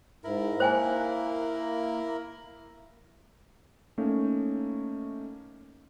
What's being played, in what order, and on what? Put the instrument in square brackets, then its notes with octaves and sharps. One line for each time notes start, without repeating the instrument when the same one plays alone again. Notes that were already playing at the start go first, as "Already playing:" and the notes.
[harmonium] G#2 [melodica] E4 A#4
[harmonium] A#3 [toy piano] C5 G5 G#5
[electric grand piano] A3 A#3 C#4 D#4